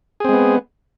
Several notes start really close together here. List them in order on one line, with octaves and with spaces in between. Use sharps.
G#4 C4 G#3 B3